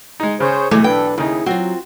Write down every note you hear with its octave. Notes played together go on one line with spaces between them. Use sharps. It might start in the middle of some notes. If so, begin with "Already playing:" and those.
G#3 D#4
C#3 G#4 C5 C#5
B1 E3 A3 G#4 D6
D4 A4 B4 G5
D#2 C#3 D#4 E4 G#4
F#3 C4 F4 F#4